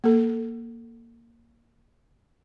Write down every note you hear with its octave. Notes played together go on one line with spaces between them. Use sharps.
A#3 A4